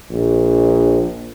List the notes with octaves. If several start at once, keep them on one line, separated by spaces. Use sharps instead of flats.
A#1